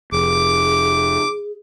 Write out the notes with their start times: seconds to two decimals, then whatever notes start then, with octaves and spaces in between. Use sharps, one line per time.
0.12 F1 G#4 D6